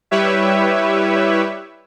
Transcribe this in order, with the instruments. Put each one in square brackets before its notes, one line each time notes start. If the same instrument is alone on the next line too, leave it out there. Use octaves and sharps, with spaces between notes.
[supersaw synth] G3 E4 G4 B4 C#5 E5